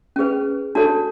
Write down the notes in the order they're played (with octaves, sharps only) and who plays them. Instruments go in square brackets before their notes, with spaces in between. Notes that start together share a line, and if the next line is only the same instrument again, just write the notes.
[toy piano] C#4 G#4 B4
D4 F#4 A4 C#5 A5